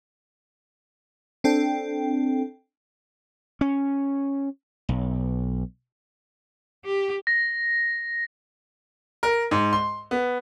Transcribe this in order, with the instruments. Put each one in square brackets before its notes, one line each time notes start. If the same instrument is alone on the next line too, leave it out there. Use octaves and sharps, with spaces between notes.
[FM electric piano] C4 D4 A4 G5
[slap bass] C#4
B1
[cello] G4
[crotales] A#6
[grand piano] A#4
G#2
C6
B3